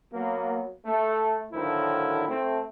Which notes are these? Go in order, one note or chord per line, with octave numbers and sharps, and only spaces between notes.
F#3 A#3 B3
A3
A2 D3 D#3 F3 F#3 E4
A3 C4